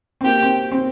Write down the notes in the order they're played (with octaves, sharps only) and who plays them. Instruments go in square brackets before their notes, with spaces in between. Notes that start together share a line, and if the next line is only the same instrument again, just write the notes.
[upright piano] C4
[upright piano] A#3 [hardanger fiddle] G4
[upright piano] C4
C4